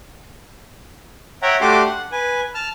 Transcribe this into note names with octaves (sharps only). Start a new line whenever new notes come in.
C#5 E5 F#5 G5 A#5
A3 D4 F#4 G4 C6 D6
F#5
B4 G#5
A5 F6